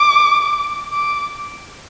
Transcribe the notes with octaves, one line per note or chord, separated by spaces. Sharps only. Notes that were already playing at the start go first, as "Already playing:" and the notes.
Already playing: D6
D6